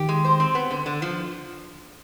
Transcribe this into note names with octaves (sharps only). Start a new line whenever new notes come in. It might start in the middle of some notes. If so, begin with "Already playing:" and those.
Already playing: D#3 G4
G#3
C5
C4
B3
D3
D3
F3